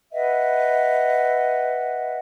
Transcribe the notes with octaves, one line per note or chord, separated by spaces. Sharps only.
B4 D#5 E5 F#5